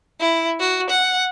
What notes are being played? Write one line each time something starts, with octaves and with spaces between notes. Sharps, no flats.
E4
F#4
F#5